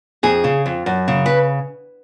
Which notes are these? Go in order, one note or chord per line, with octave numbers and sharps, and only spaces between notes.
F2 G#4
C#3
F2
F#2
C#3
B4